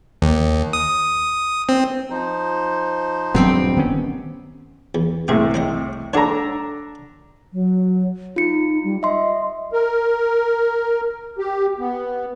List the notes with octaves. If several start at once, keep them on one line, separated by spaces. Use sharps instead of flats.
D#2
D#6
C4
F3 D#4 C5
D#1 G2 F#3 B3 C4 G4
D#3 B3 C#4
E2
C2 A2 G#4 G5
C4 C5 D#5
D4 A4 C#5 F#5 A#5
F#3
D#4 F4 C#7
G3
D#5 E5 C6
A#4
G4
B3